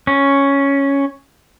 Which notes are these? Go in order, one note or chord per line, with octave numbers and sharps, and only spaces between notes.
C#4